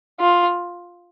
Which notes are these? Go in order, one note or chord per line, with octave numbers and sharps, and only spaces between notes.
F4